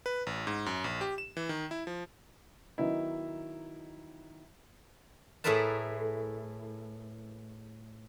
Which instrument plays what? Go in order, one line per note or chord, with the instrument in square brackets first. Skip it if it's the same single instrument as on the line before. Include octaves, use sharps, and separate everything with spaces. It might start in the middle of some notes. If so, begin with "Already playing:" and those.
[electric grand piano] B4
A1
G#2
F#2
A#1
G4
E7
E3
D#3
E4
F3
[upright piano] D#3 F#3 B3 D#4 E4
[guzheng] A2 E4 G#4 A#4 B4 A5